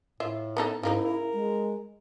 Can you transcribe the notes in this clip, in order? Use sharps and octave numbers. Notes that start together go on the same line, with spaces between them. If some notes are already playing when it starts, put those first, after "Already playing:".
A2 F4 E5
B3 D#4 A4
G#2 C#3 A#3 D#4 E4
A#4
G#3